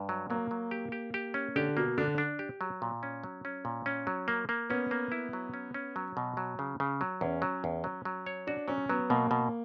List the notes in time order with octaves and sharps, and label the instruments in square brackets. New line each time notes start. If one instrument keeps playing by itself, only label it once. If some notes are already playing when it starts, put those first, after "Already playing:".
Already playing: [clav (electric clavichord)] G2
F#3
[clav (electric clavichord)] F#3 [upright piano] A#3
[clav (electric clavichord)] F#3
G4
G4
G4
C#4
[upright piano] D3 [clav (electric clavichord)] G4
[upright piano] B2 [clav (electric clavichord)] A#3
[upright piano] D3 [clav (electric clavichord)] D4
[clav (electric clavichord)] D4
G4
F#3
A#2
C#4
F#3
C#4
A#2
C#4
F#3
A#3
A#3
[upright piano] B3 [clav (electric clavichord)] C#4
[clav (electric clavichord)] A#3
E4
F#3
C#4
C#4
F#3
B2
F#3
C#3
C#3
F#3
[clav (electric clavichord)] E2 [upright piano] C#4
[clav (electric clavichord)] F#3
E2
F#3
F#3
C#5
[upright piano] D4 [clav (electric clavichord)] F#4
[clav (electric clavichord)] F#3 [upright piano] C#4
[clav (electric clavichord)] F#3 [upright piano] B3
[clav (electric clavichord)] B2 [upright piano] A#3
[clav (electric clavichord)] B2